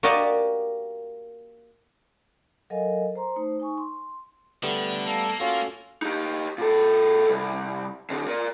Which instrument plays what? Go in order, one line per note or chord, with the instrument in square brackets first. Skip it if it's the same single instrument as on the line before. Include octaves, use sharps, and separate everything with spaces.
[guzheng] A#3 F#4 G4 D5 D#5
[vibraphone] F#3 A4 A#4 D#5 F5 G#5
C5 A#5 C6
A3 D#4 C5
D#4 G#5 C#6
C6
[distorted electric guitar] D3 [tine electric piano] G3 A3 B3
[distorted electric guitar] A#3 [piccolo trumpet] A4
[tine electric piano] C#4 F#4 A4 [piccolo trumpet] F4
[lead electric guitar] D#4 G4
A#2 A4
C2
D3 C4
A#4 D5